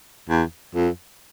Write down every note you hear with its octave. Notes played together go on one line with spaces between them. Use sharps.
E2
F2